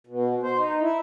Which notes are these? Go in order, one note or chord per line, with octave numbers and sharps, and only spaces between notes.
B2
C5
D#4
E4